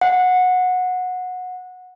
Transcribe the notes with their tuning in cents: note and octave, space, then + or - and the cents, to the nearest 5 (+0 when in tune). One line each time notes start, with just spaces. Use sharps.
F#5 -20